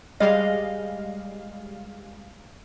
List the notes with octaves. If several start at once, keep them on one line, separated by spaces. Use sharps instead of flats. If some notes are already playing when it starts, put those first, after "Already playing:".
G3 G#3 D#5 F5